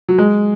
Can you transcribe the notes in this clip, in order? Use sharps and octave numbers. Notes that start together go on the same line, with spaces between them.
F#3
G#3